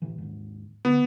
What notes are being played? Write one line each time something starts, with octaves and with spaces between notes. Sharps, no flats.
A2 E3
D#2 G#2
D2 B3